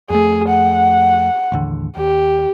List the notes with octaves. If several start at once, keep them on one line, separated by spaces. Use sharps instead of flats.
F2 A3 G#4
F#5
A1 D#2 D3
D#2 G4